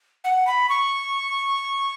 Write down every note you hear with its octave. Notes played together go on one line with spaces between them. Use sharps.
F#5
B5
C#6